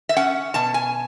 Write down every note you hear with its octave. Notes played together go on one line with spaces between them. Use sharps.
E5
C#4 F#5
B2 A5
G#5